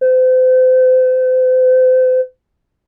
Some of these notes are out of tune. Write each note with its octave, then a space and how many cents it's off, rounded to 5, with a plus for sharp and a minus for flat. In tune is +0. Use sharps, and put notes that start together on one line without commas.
C5 -35